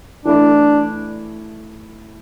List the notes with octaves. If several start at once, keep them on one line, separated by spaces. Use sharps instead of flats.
E3 A3 D4 E4